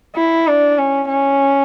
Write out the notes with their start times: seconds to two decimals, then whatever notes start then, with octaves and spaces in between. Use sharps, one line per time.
0.16 E4
0.47 D4
0.78 C#4
1.09 C#4